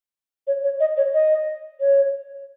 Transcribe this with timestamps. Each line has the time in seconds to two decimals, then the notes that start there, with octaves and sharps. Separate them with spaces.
0.47 C#5
0.64 C#5
0.80 D#5
0.97 C#5
1.14 D#5
1.81 C#5